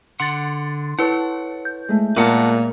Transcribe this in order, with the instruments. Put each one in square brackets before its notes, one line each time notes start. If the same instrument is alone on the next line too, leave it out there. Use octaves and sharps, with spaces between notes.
[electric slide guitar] D3 F#5 [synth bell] C6 A6
[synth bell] E4 B4 [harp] A4 C#5 [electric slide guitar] F#5
[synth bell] G6
[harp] G#3 A3
[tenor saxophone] A#2 [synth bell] B3 [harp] A#4 [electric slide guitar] B4 F#5 A5